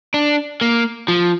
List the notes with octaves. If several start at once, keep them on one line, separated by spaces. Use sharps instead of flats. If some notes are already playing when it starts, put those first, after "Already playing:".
D4
A#3
F3